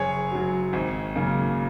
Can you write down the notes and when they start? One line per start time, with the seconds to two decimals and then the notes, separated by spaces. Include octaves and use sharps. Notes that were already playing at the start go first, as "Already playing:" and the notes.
Already playing: F#1 G#4 C#5
0.32 F#2 F#3
0.73 G#1
1.15 F#2 C#3 A#3